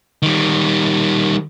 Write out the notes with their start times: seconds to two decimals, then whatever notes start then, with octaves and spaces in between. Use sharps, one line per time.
0.22 D#3 G3